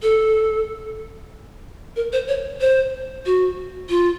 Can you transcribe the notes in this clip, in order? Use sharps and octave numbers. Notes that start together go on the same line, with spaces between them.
A4
A#4
C5
C#5
C5
F#4
F4